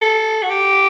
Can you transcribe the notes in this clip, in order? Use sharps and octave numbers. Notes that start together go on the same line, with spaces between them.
A4
F#4
G4